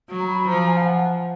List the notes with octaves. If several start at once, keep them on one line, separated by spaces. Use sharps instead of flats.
F#3
A#5
B5
F3 A#5
G#5
F5
F#5